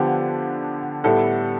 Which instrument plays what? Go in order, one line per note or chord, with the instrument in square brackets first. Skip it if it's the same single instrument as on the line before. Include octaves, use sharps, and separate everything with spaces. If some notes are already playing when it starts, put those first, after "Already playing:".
Already playing: [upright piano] D3 F3 B3 G4
A2 G3 B3 A4